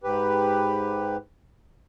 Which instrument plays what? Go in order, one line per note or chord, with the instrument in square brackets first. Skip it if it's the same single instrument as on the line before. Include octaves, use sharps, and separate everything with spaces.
[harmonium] G#2 G4 B4